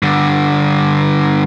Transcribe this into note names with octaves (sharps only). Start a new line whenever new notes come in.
G2 D3